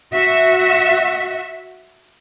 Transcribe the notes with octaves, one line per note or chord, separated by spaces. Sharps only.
F#4 E5